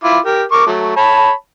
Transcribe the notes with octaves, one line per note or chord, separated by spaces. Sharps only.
E4 F4 D6
G4 A#4
A#4 C#6 D6
F#3 A3
C#5 A5 B5